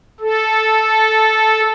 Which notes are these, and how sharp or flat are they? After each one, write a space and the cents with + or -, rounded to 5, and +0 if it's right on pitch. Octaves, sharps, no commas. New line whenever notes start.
A4 -10